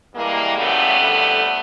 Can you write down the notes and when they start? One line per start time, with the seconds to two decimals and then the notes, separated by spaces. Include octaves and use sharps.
0.15 G2 E3 G3 G#3 A#3
0.57 F#2 C#3 E3 G3 A3 B3
0.99 F2 D3 G3